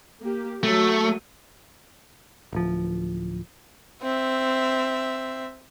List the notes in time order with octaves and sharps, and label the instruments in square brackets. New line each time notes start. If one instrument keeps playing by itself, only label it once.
[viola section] A#3 G4
[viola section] F#3 [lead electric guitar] A3
[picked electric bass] D1 F3
[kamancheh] C4 E5